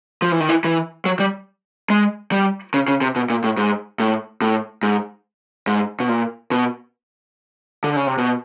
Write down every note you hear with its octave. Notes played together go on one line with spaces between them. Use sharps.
F3
E3
D#3
E3
E3
F#3
G3
G#3
G3
C#3
C#3
C3
B2
A#2
A2
G#2
A2
A2
G#2
G#2
B2
A#2
B2
D3
C#3
C3
B2